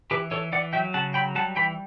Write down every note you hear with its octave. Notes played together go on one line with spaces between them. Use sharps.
E3 G4 B4
E3 A4 C#5
E3 D5 F#5
F#3 E5 G5
C#3 F#5 A5
F#3 G5 B5
G3 F#5 A5
E3 G5 B5